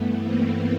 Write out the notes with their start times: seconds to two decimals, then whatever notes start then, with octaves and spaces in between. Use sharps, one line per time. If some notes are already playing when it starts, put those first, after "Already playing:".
Already playing: G2 E3 A3 B3
0.21 A#3 C4